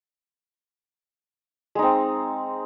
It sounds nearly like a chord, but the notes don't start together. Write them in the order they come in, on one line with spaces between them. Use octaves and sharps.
G#3 D#4 C4